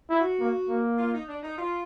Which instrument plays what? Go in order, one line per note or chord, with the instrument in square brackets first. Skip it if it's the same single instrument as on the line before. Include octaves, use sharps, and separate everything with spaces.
[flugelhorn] E4
[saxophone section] F#4
[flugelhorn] A#3
A#3
[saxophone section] F4
D#4
D4
D#4
F4